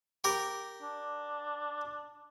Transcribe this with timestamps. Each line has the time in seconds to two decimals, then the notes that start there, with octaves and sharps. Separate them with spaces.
0.24 G4 A#4
0.82 D4